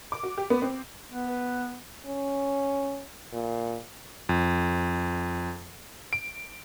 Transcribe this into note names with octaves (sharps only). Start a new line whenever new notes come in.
D6
F#4
G4
B3
C4
B3
B4
C#4
A#2
F2
D7